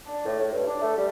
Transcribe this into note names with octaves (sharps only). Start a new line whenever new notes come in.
D4
A2
A2
G2
D4
A3
G3